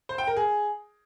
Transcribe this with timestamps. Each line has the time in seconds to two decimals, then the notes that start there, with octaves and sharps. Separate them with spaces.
0.09 C5
0.18 G5
0.27 A#4
0.36 G#4